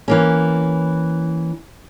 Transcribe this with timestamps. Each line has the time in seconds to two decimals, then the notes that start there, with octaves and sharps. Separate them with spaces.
0.08 E3 A#3 C#4